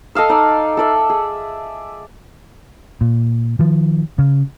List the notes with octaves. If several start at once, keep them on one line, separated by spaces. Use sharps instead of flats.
A4 D#5 F5 E6
D#4 D5
A4 D5 E5
G#4
A#2
D#3 F3
C#3